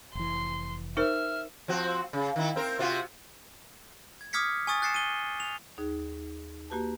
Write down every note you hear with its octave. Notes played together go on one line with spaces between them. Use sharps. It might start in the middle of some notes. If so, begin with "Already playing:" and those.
F1 E3 C6
D#4 A#4 C5 E5 F6
F3 C4 F#4
C#3
D#3 E4
C4 A#4
C3 F4 F#4
G#6
D6 D#6 F6 G#6 B6 C#7
G#5 C#6 D#6 A6
F#6 A6 C7 C#7 E7
D#7 G7
F7
D#2 D#4 G#4
A#3 F#4 G4 B4 A5